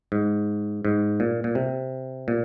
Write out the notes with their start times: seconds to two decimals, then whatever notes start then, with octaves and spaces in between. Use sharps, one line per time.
0.12 G#2
0.85 G#2
1.20 A#2
1.44 A#2
1.55 C3
2.28 A#2